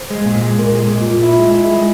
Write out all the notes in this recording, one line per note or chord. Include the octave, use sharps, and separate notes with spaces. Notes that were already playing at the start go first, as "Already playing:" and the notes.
Already playing: C5
G#3
A#2
G#3
A#2 A#4
G#3 G#4
A#2
A#2 F4
E4 F4
G#3
F4
E4
G#4
G#3